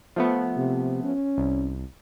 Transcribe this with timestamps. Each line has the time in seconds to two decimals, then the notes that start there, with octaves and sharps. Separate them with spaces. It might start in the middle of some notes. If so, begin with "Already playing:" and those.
0.16 F3 A3 B3
0.57 C3
1.03 C#4
1.38 C2